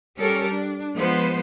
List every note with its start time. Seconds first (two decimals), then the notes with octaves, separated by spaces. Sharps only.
0.18 G3 C#4 G4 A4 A#4
0.50 D4
0.95 F3 G#3 B3 B4 C5